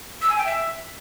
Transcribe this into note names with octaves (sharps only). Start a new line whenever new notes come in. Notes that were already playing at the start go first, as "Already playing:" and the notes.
E6
G#5
G5
E5